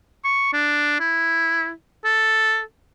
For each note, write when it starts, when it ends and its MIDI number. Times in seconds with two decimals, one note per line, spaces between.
0.24 0.49 85
0.53 0.97 62
1.00 1.70 64
2.05 2.61 69